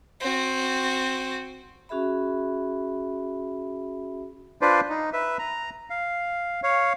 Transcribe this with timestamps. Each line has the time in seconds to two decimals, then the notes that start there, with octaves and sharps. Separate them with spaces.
0.21 C4 F#4
1.89 C#4 F#4 G#4 E5 B5
4.61 D4 F4 B4 C5 D5
4.89 D#4
5.13 B4 E5
5.39 A#5
5.90 F5
6.63 C#5 F5